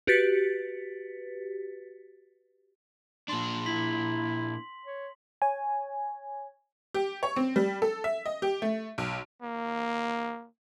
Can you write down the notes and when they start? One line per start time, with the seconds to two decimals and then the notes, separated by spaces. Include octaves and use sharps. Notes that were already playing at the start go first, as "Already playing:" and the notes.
0.07 F#4 G4 B4 A6 B6 C#7
3.29 A#2 D4 C6 F#7
3.66 E4 B6 F#7
4.86 C#5
5.42 C#5 G#5
6.94 G4
7.23 C#5
7.36 C4
7.56 G3
7.82 A4
8.04 E5
8.26 D#5
8.42 G4
8.62 A3
8.98 B1
9.42 A#3